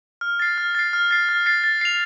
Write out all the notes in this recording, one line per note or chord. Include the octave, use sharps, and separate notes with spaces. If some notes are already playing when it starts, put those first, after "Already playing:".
F6
A6 C7
F6
A6 C7
F6
A6 C7
F6
A6 C7
A6
C7 F7